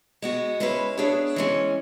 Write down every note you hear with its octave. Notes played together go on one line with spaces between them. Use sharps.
G#3 B3 F#4
G#3 C#4 E4 B4
B3 D4 G#4 C#5 E5
E3 G#3 C#4